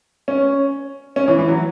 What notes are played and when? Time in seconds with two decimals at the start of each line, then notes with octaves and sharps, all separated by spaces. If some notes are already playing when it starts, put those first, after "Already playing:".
0.28 C#4
1.16 C#4
1.28 E3
1.39 E3
1.49 F#3